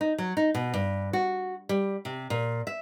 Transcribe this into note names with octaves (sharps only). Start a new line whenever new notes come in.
D#4
F#3
D#4
B2
G2
F#4
G3
C3
A#2
E5